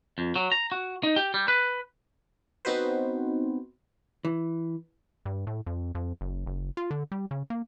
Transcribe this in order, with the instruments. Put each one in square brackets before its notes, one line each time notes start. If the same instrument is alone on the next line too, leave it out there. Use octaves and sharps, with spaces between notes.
[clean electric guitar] F2
F#3
A#5
F#4
D#4
G4
G3
B4
[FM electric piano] B3 C4 D#4 F#4 B4 C5
[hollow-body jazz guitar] E3
[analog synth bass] G2
A2
F2
F2
F#1
F#1
F4
D3
G3
C#3
A#3